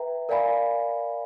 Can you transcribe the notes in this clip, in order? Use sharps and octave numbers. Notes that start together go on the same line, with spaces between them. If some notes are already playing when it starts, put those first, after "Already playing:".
Already playing: B4 E5 G5 A#5
A#4 D5 F5 G#5 B5